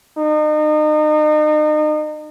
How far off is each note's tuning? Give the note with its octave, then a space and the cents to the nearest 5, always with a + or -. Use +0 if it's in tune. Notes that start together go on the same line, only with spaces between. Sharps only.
D#4 -35